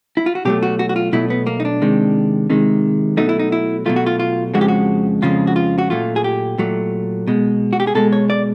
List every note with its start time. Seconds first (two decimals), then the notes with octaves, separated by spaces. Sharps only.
0.17 E4
0.26 F4
0.35 F#4
0.45 B2 F#3 A3 G4
0.63 F#4
0.79 F#4
0.89 F#4
0.96 F4
1.13 B2 F#3 A3 E4
1.30 B3
1.47 A#3
1.60 D#4
1.65 D4
1.82 C3 D#3 G#3
2.50 C3 D#3 G#3
3.17 B2 F#3 A3 D#4
3.29 E4
3.39 D#4
3.52 E4
3.86 B2 F#3 A3 F4
3.96 F#4
4.06 F4
4.20 F4
4.54 F2 C#3 F3 G#3 F#4
4.61 G4
4.68 F#4
5.22 F2 C#3 F3 G#3 F4
5.47 F#4
5.56 F4
5.78 F#4
5.90 A#2 F#3 A3 F4
6.16 G#4
6.24 G4
6.58 A#2 F#3 A3
7.27 B2 G#3
7.73 F#4
7.80 G4
7.87 G#4
7.95 B2 G#3 A4
8.13 C#5
8.30 D5